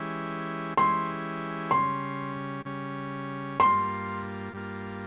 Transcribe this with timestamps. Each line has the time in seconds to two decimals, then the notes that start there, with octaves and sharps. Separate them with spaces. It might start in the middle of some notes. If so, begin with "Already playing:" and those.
Already playing: E3 G#3 C#4 E4 G4
0.77 E3 G#3 C#4 E4 G4 C6
1.71 C#3 G3 C#4 C6
2.65 C#3 G3 C#4
3.59 G2 G3 A#3 F4 C6
4.53 G2 G3 A#3 F4